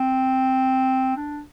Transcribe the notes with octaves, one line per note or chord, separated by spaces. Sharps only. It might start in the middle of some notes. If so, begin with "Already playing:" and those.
Already playing: C4
D4